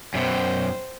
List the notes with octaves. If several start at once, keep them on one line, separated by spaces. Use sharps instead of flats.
F#2 B2 C5 G5